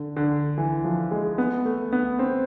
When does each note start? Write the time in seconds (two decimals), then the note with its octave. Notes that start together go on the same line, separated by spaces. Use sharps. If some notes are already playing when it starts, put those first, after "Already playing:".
Already playing: D3
0.17 D3
0.58 E3
0.84 F3
1.11 G#3
1.38 B3
1.65 A3
1.93 B3
2.19 C4